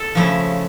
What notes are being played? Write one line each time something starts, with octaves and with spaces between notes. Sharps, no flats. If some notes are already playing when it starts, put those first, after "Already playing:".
Already playing: A4
C#3 F3 A3 E4